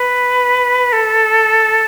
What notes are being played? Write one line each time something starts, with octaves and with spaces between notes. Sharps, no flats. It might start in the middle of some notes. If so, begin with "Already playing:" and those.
Already playing: B4
A4